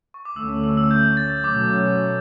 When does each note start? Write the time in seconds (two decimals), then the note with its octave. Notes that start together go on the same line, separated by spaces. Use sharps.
0.14 C#6
0.25 D6
0.36 D2 D3 A3 C#4 E6
0.49 D6
0.64 E6
0.77 E6
0.91 G6
1.17 A6
1.44 B2 F#3 A3 C#4 D6